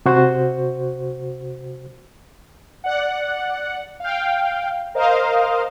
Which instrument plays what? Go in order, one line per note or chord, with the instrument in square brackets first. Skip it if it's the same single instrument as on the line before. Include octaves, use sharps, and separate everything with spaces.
[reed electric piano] C3 F#4 C5
[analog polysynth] D5 F#5
F5 G5
A#4 C5 D#5 F5